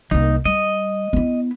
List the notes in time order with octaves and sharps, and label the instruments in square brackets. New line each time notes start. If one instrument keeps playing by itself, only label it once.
[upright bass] C2 A#3 [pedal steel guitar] D#4
[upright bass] G3 [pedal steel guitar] D#5
[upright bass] B3 E4